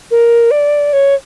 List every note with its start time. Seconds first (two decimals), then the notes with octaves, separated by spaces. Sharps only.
0.11 A#4
0.51 D5
0.93 C#5